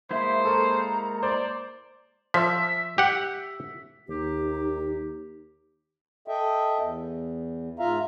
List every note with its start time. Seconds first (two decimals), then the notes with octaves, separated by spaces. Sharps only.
0.11 G#3 A#3 E4 C5 E5
0.45 A4 A#4 A#5 C#6
1.23 C5 D5
2.34 F3 E5
2.98 G4 F#5
4.09 D#2 D#4 G4
6.28 A4 D#5 E5 G5
6.78 E2
7.79 G#2 F4 E5 F5 A#5